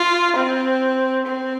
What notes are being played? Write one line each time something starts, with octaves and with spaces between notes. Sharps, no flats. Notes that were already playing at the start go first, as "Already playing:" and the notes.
Already playing: F4
C4
C4